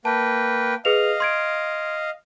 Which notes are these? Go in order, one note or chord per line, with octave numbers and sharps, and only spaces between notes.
A#3 B4 G5 A5
G#4 B4 D#5 F5 F7
C6 G#6 D7